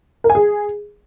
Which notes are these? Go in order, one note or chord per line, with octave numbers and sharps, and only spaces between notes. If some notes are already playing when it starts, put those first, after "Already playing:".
A#4
G#5
G#4